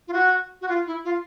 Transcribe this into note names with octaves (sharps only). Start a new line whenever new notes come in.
F4
F#4
F#4
F4
E4
F4